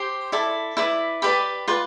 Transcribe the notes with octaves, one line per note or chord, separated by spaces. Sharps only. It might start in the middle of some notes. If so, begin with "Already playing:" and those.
Already playing: G4 C5 C6
E4 A4 D5
E4 B4 D5
G4 B4 D5 B5
F4 B4 D5